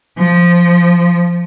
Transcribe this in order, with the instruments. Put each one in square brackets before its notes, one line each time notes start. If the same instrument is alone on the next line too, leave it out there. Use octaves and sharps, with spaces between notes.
[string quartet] F3